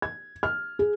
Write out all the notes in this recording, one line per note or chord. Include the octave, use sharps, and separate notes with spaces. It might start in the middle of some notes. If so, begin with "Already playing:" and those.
G#6
F6
G#4